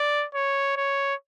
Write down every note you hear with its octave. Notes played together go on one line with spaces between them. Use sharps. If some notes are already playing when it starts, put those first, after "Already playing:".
Already playing: D5
C#5
C#5